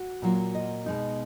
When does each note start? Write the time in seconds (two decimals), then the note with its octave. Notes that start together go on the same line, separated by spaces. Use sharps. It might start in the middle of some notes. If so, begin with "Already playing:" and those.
Already playing: F#4
0.22 A#2 F#3 A#3 F4
0.55 D#5
0.86 B2 G#3 D#4